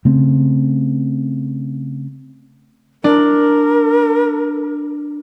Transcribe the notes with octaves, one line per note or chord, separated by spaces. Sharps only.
C#3 A3 C4
D4 A#4